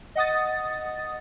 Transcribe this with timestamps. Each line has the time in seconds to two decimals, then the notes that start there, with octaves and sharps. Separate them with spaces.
0.15 D#5 F#5 D#6 A6